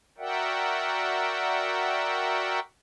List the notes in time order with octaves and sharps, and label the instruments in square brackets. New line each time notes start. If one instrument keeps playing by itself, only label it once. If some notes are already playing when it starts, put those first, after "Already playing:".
[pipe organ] F#4 A#4 D5 E5 F#5 G5